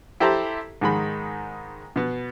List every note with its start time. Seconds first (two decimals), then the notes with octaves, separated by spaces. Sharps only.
0.20 E4 G4 A4 C5 A5 A#5
0.81 G#2 D#3 G#3 B5
1.96 B2 B3